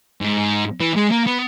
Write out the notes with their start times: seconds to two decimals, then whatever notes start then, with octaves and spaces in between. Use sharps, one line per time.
0.21 G#2
0.81 E3
0.97 G#3
1.11 A#3
1.27 B3